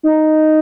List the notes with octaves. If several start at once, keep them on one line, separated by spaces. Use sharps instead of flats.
D#4